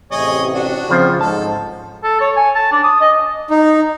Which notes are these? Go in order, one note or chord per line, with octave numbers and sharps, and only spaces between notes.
A1 C3 G#4 C#5 D#5
D4 F#4
C#3 F3 C4 F4
G#2 A4 A5
A4
C#5
G#5
A5
D4
D#6
D#5
D#4